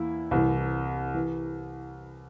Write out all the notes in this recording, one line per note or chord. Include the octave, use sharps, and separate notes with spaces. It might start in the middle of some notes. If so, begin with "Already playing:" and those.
Already playing: E2 A#3 E4
C2 C3 E3
E3